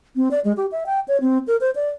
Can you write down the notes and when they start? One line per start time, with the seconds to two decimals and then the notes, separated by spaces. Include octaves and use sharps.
0.16 C4
0.31 D5
0.44 G#3
0.57 G4
0.72 E5
0.86 G5
1.08 C#5
1.21 C4
1.47 A#4
1.61 C5
1.75 D5